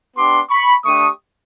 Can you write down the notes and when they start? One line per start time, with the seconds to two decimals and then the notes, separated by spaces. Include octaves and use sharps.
0.16 B3 D4 G4 C6 D6
0.50 B5 C#6
0.84 A3 D4 G4 C#6 D#6